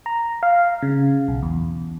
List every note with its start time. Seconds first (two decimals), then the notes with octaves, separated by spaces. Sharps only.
0.06 A#5
0.43 F5
0.82 C#3
1.28 B1
1.43 E2